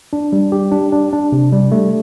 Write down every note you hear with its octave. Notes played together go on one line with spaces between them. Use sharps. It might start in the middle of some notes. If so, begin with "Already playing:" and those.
D4
G3
G4
D4
D4
D4
C3
G3
A3